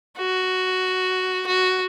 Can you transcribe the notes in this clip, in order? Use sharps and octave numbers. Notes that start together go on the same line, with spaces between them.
F#4
F#4